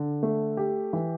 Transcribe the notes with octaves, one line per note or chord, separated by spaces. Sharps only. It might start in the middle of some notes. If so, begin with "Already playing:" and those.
Already playing: D3
A3
G4
E3